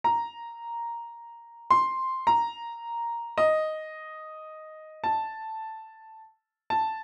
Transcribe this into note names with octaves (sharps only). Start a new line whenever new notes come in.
A#5
C6
A#5
D#5
A5
A5